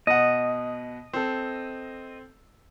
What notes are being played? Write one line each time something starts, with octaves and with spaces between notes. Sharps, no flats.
B2 D#5 F#5
C4 A4